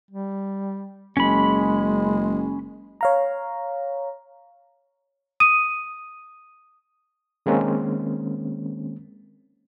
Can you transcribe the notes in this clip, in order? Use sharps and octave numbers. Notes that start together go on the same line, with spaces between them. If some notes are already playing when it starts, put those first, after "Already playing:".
G3
F#1 G#3 C#4 B5
C#5 F5 A#5
D#6 D#7
D#3 G#3 A#3 C4 C#4